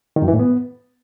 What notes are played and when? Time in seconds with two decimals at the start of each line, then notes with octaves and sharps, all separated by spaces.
0.16 D#3
0.22 F#2
0.28 E3
0.34 A2
0.39 B3